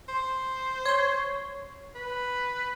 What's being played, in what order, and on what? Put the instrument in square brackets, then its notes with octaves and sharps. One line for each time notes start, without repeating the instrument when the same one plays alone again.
[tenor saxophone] C5
[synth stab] C#5 C6
[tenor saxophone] B4